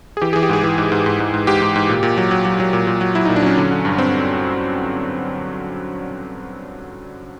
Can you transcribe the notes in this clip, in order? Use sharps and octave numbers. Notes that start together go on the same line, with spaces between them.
G#4
E3 G4
E3 G#4
G4
G#2 G#4
E3
G#2
G#2
G#2
G#2
G#2
G#2 G4
G#2
G#2
A#2
A#2
F#3
F#3
F#3
F#3
A#2
A#2
F#3
F#3 E4
A#2 D#4
D4
F#3 C#4
D3
D3
G2
G2 C4